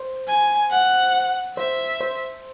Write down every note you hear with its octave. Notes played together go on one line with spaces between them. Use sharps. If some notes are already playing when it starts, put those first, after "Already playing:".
Already playing: C5
G#5
F#5
C5 E5
C5